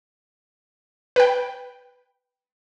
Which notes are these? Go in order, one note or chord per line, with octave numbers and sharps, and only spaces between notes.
B4 G5